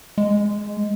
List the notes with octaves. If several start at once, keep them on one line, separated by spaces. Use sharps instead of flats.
G#3